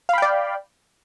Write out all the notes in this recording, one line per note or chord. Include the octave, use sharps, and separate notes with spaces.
D5 F5 G5 B5